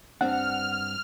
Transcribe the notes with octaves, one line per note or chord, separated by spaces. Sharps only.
G2 C4 D4 F#5 F6